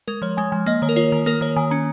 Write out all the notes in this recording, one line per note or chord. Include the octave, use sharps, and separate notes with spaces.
G#3 A#4
F3 C#5
G#3 G#5
F3 G#5
A#3 D#5
D#3 C#5
A#4
F4 C#5
D#3
A#3 A#4
D#3 C#5
D#3 G#5
C#4 A#5